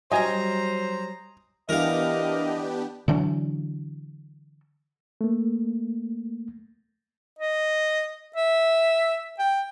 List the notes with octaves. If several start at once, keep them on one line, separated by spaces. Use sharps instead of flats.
F#3 G3 C5 D#5 G#5 A#5
E3 B3 D4 G4 A#4 D#5 F5
D3 E3 F#3 D4
A3 A#3
D#5
E5
G5